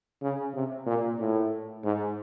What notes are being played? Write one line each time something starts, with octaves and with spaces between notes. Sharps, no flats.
C#3
C3
A#2
A2
G#2